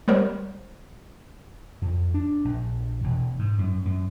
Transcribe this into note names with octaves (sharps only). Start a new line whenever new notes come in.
G3 G#3 B3 A#4 C5 C#5
F2
D4
A#1
E1
G#2
F#2
F#2